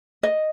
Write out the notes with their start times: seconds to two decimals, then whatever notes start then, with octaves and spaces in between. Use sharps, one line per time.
0.23 D#5